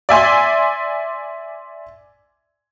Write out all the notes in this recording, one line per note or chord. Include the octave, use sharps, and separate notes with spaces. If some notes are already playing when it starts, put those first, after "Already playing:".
D5 E5 G#5 C6